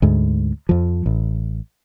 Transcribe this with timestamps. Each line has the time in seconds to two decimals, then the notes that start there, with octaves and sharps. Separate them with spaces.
0.02 D2 G#2
0.69 F2 F3
1.06 A1